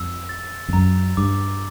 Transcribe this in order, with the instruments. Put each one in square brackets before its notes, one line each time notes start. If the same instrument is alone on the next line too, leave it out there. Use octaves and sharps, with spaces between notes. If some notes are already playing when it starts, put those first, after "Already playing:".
Already playing: [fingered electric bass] F2 [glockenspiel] E6
[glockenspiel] A6
[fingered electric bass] F2
[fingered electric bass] F#2 [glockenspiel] A#5
[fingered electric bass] G2 [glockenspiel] D6